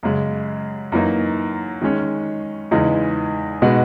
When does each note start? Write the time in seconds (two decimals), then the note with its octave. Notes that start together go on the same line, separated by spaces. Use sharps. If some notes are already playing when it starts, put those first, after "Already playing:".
0.03 F#2 C#3 G#3
0.92 F#2 E3 A#3 D#4
1.81 D#3 G#3 C#4
2.71 E2 C#3 E3 G#3 D#4
3.62 B2 G#3 B3 D#4 F#4